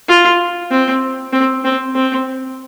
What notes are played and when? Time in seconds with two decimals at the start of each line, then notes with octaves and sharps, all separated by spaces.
0.09 F4
0.71 C4
1.33 C4
1.64 C4
1.95 C4